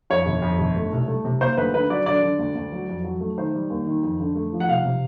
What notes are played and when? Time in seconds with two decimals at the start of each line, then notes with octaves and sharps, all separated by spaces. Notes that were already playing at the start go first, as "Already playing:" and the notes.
0.10 F2 C#5
0.26 G1
0.42 F2
0.59 G1
0.75 A3
0.92 C2
1.08 A3
1.25 C3
1.41 A#3 C5
1.57 D2 B4
1.74 D3 B4
1.90 F#3 D5
2.06 D3 D5
2.22 D3
2.39 D2
2.56 D2
2.72 F#3
2.89 F2
3.04 F#3
3.20 A3
3.38 D#3 C5
3.54 G3
3.70 D#2
3.87 D#3
4.03 F2
4.20 D3
4.35 A3
4.53 F3
4.60 F#5
4.69 C3 F5
4.85 C3